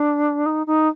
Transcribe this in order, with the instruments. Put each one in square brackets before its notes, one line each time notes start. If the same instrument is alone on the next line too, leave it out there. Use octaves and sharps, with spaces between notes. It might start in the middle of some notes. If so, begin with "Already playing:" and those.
Already playing: [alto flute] D4
D#4
D#4